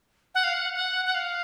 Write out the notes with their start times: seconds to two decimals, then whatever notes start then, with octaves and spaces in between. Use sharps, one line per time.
0.35 F#5
0.44 F5
0.54 F#5
0.75 F#5
1.06 F#5
1.14 F5